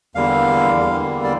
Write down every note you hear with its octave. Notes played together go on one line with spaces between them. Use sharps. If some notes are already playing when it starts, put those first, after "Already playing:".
E2 D3 G3 A#3 F5
E2 D3 G3 A#3
D5